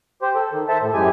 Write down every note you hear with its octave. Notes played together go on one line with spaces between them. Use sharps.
G4 C5
A4
D#3
A4 C5 E5 A5
A2
F#2 E3 G#3 G4 G#5